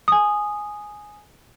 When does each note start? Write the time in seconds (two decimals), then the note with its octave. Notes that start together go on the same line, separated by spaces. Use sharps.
0.08 G#5 D#6